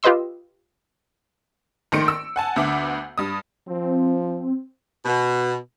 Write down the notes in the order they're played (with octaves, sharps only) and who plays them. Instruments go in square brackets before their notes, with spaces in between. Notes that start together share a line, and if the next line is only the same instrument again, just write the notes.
[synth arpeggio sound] F4 G4 B4 D#5 C6 E6
[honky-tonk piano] A#1 D#3 A3 C6 C#7 D7
E6
F#5 G#5 A5
D2 D3 B3 E5 D6
G2 D#6
[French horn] F3 [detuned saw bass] C4
[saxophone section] B2